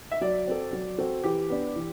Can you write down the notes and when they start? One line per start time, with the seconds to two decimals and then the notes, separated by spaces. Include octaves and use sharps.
0.11 E5
0.21 F#3 D5
0.47 C4 F#4 A4
0.73 F#3
0.98 C4 F#4 A4
1.24 E3 G4
1.50 B3 D4
1.76 E3